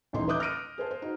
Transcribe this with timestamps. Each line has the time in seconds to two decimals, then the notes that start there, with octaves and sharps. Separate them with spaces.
0.13 D#1 A1 E3 D#4 C6
0.28 B4 E5 D6 D#6 F#6 G6
0.40 F6 A#6 D7 D#7
0.78 G#4 B4 C5 A5
0.91 C5
1.02 D#4 F#4